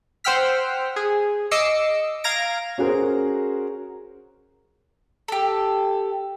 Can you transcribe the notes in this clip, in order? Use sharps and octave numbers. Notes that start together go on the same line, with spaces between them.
C5 F#5 G5 E6 F6 B6
G#4
D#5 D6 E6 C7 C#7
F5 A#5 G#6 A#6 D7
C#4 F#4 G#4 A#4 C5
G4 A4